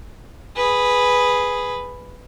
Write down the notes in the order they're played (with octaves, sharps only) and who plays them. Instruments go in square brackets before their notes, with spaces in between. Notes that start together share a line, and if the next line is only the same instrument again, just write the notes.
[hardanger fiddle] G#4 B4